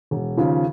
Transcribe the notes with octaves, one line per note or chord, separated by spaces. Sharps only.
E1
D#2 C#3 F3